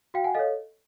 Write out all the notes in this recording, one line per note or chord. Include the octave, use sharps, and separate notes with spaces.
F#4 F5 G5
F#5 G#5
A4 C#5 D#5 F5